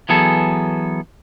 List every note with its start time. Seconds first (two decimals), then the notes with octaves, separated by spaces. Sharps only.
0.09 E3 F#3 B3 G#4 A4